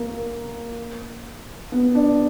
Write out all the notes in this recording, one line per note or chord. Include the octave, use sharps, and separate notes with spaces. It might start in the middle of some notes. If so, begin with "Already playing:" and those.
Already playing: A#3
B3
D4